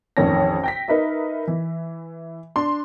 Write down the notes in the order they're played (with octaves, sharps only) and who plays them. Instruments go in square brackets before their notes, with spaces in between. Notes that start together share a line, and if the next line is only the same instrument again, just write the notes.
[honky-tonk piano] A1 F2 D#3 C#4 A5 A#6
G5 A#6 B6
D#4 A#4 B4 D#5 E5
E3
D4 C6